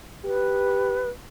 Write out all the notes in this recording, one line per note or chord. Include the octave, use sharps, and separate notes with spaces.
G4 B4